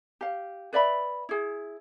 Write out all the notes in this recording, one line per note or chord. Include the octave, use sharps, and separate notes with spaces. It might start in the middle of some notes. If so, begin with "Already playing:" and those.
G4 F5
B4 D5 E5 B5
E4 G#4